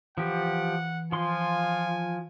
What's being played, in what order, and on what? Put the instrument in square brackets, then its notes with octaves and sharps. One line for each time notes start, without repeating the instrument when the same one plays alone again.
[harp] E3 [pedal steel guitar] F3 G4 [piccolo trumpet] F#5
[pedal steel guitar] F3 C6 [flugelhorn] F4 [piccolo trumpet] G#5